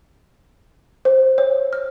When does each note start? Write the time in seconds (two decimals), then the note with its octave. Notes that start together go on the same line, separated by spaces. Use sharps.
1.05 C5
1.38 C#5
1.73 F6